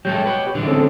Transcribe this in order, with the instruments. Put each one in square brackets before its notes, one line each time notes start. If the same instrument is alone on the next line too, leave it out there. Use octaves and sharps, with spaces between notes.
[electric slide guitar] F#3 G#3 A4 [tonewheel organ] G4 C#5 G5
[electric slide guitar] F#4 B4
D3 E3 G#3
[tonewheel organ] C4 C#4 A4